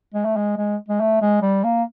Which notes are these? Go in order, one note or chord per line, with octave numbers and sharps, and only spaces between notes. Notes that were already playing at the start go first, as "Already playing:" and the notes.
G#3
A3
G#3
G#3
G#3
A3
G#3
G3
A#3